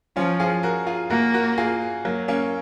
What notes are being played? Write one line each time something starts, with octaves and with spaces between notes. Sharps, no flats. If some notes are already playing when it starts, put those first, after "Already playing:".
F3 C#4 F4
F4 G#4
F#4 A#4
F4 G#4
A#3 F#4 A#4
F#4 A#4
F4 G#4
F#3 A#3
A#3 C#4